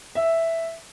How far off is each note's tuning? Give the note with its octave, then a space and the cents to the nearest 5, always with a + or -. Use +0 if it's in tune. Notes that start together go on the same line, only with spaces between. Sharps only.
E5 +0